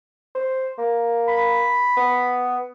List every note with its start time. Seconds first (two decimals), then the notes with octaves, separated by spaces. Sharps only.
0.35 C5
0.78 A#3
1.28 B5
1.97 B3